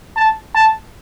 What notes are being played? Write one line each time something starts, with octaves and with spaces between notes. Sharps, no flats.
A5
A5